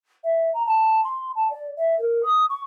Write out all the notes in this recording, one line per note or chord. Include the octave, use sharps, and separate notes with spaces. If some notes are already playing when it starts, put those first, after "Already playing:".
E5
A#5
A5
C6
A5
D5
E5
A#4
D#6
C#6